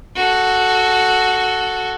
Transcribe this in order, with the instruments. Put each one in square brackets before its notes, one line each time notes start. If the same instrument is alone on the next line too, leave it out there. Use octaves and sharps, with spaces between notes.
[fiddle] F#4 A4